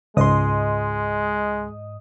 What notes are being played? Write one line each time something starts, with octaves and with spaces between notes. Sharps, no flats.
C#2 G#2 G#3 D#5 C6 D#6